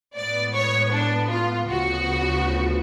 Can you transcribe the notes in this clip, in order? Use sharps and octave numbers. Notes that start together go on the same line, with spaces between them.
A2 G#3 B3 D5
C#5
D4
F4
D2 C#3 F3 B3 F#4